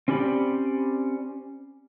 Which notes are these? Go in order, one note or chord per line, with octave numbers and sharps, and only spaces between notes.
C4 C#4 G4 D5 B5